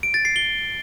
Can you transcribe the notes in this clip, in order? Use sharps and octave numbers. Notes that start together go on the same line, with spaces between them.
D7
A6
C7
G7